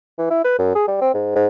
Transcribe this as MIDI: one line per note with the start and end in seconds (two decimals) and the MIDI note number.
0.18 0.29 52
0.30 0.42 64
0.44 0.55 71
0.59 0.71 42
0.75 0.83 68
0.88 1.00 55
1.01 1.09 60
1.14 1.32 44
1.35 1.47 44